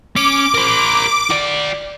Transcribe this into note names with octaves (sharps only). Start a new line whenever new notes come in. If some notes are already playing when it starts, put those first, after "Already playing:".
C#4 D6
A#4 C5
F#4 D5